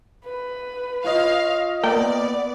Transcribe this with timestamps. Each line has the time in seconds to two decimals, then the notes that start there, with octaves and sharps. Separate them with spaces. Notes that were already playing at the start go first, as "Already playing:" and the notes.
0.24 B4
1.04 F4 C#5 D#5 F5
1.83 A#3 B3 D5 G5